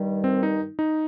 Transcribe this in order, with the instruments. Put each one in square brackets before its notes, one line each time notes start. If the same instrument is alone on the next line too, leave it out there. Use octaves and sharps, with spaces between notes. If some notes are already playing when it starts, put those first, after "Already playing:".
Already playing: [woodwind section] G2 D#3 G3
[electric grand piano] C4
D#4
D#4